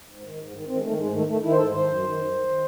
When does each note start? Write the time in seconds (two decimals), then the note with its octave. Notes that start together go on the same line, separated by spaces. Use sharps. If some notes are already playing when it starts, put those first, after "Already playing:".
0.08 G#2
0.23 D#3
0.37 G#2
0.53 D#3
0.67 D#3 C4
0.76 G#3
0.83 D#3 A3
0.97 G#2 G#3
1.12 D#3 A3
1.27 D#3 A3
1.42 D#3 E4
1.52 C5
1.56 G#2 A4
1.71 D#3 C5
1.87 F#2
2.02 D#3
2.17 F#2
2.31 D#3
2.47 D#3